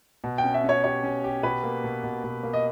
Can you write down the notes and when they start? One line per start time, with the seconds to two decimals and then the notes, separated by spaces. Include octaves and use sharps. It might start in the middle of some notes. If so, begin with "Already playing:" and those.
0.24 B2
0.38 G5
0.44 C#4
0.54 E5
0.64 C#4 C#5
0.84 G4 C#5
1.03 C#4
1.24 G4
1.43 B2 B4
1.63 A#3
1.84 B2
2.04 B2
2.24 B2
2.43 A#3
2.53 D#5